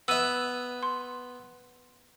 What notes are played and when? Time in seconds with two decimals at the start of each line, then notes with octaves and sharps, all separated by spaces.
0.08 B3 E5 E6 D#7
0.83 C6